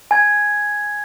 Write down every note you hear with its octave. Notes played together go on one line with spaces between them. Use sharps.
G#5 G#6